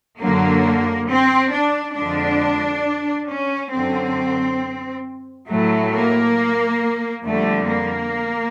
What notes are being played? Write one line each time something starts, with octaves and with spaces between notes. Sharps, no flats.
F#2 D3 F#3 A#3
C4
D4
F2 D3 F3 G#3 D4
C#4
F#2 D3 F#3 C4
A2 F#3 A3
A#3
F2 D3 G3 A3
A#3